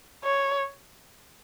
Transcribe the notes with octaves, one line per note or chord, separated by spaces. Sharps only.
C#5